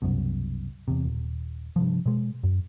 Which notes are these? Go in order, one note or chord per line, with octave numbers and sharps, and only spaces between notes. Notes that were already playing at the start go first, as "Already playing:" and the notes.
C2 F#2 B2
E2 C3
D#1
G2 C3 F3
B2 G#3
F#2